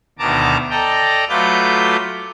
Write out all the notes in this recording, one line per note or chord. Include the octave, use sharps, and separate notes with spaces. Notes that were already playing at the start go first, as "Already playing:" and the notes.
D2 B2 D#3 A5 A#5 D6
A4 D5 D#5 G5 A#5
F#3 A3 F4 B4 D6 G6